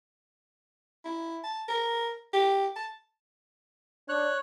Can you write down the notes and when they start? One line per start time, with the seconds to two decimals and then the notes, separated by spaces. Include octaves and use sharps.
1.05 E4
1.44 A5
1.68 A#4
2.33 G4
2.76 A5
4.09 D4 C#5 F#6